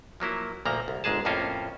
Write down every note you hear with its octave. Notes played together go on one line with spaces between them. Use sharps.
F3 F#3 A#3 E4
D2 A#2 F3 A#3 A#5
C2
G1 G#2 G#3 G#4 A5
F2 A2 A#3 C#4 F4 C5